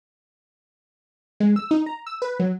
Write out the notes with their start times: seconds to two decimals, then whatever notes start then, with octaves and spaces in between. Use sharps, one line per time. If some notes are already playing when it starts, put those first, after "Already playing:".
1.40 G#3
1.56 E6
1.71 D#4
1.86 A#5
2.06 E6
2.22 B4
2.40 F#3